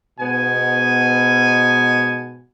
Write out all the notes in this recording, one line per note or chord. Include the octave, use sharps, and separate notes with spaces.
G#2 B2 B3 G#5